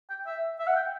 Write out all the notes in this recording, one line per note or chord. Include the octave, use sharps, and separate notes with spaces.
G5
E5
E5
F#5
G5